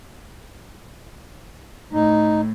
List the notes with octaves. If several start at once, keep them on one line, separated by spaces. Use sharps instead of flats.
A2 D#4